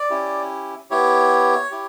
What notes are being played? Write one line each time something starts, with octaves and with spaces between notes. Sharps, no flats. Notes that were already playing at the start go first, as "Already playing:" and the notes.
Already playing: D5
C#4 E4 G4
B3 E4 G4 C#5
E4 G4